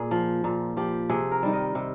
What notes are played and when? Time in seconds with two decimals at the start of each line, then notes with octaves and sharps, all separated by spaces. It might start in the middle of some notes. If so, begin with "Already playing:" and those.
Already playing: A#2 G#4
0.11 F3
0.44 A#2
0.77 F3 G4
1.10 C3 G#4
1.31 A#4
1.43 D#3 G3
1.53 D#5
1.75 C3